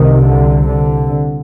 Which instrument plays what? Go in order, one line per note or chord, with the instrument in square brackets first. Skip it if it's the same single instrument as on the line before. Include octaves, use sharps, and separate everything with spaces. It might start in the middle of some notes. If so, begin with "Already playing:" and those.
Already playing: [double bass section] C2 C3 D#3
D3
D3